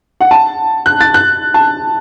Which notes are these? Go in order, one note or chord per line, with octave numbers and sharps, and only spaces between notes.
F#5
A5
F#6
A6
F#6
A5